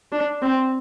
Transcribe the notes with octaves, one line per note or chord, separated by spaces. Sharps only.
D4
C4